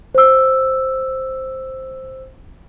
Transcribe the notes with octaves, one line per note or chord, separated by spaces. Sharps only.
C5 E6